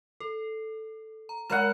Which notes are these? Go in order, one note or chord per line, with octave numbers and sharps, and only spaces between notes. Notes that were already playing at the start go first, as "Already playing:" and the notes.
A4
A#5
G#3 A#4 F5 F#5 A#5 E7